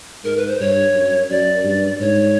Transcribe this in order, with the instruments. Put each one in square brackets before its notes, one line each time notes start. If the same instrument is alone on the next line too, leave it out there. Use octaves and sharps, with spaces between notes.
[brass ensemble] G#2 [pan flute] A#4
[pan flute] B4
C5
[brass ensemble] G2 [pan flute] C#5
[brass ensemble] F#2
[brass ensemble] F#2 [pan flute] D5
[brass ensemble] G2
[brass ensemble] G#2 [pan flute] C#5